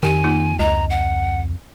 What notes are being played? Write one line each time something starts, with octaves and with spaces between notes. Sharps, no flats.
F2 D#3 G4 G#5
A#3 D#4 F4
C#2 D#5 A#5
F#5